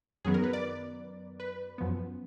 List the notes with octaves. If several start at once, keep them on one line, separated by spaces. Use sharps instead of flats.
F#2 D#3 F#3 B3 G#4
A#4
B4
D5
B4
F#2 F3 B3